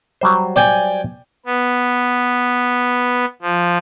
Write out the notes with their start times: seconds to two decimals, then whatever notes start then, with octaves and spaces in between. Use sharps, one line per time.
0.21 F#3 G3 C5
0.56 D5 G5 G#5
1.46 B3
3.42 F3